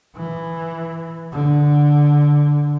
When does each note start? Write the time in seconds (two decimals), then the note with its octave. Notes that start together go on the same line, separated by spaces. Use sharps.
0.16 E3
1.32 D3